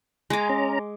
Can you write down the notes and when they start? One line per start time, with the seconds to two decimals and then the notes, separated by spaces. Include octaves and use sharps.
0.30 G#3 G#5 A#5 D6
0.49 C#4 A#5